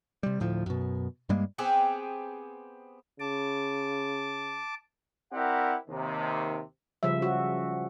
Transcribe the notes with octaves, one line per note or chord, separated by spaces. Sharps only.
C3 G3
D2 A2 F3
F#2 B2
G2 G3 G#3 A#3
B3 C4 G4 G#4
C#3 A5 D6
C4 E4 G4 A#4 D5 F#5
D#2 C3 D#3
C#3 F3 G3 E5
F#4